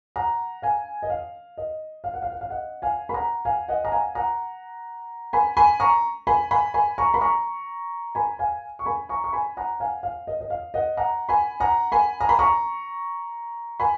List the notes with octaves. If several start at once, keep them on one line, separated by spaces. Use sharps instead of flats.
F#5 A#5
F5 G#5
D#5
F5
D#5
F5
F#5
F5
F#5
F5
D#5 F#5
F5 G#5
B5
F#5 A#5
F5 G#5
D#5 F#5
A#5
F5 G#5
F#5 A#5
G#5 B5
G#5 B5
A#5 C#6
G#5 B5
G#5 B5
G#5 B5
A#5 C#6
B5
A#5 C#6
G#5 B5
F5 G#5
C#6
G#5 B5
A#5 C#6
C#6
G#5 B5
F#5 A#5
F5 G#5
F5
D#5
D#5
F5
D#5 F#5
F#5 A#5
G#5 B5
F#5 A#5
G#5 B5
A#5
B5
A#5 C#6
G#5 B5